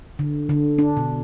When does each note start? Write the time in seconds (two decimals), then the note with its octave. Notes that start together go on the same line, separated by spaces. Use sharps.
0.19 D3
0.49 D3
0.79 D4
0.97 B2